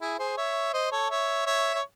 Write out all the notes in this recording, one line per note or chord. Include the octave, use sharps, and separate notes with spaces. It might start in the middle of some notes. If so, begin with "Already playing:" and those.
E4 G#4
G#4 C5
C#5 E5
C5 D#5
A4 C#5
C#5 E5
C#5 E5
C#5